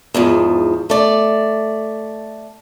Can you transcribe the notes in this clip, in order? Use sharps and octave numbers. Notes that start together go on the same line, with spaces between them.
E2 G#2 F3
A3 D5